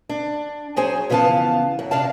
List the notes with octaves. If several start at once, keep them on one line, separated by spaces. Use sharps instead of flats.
D4
F#3 G#4 C5 C#5 G#5
F2 C#3 E3 B3 F5 A5
F#2
C3 D4 F5 A5